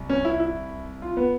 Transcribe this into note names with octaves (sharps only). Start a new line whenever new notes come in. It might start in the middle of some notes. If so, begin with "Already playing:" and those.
Already playing: C2
C#4
E4
E4
F4
B3